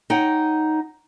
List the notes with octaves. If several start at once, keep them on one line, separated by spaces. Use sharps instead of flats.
D#4 C#5 F#5 G5